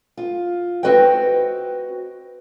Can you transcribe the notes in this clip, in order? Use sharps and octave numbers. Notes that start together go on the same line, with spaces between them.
F4
C4 F#4 B4 D#5 G5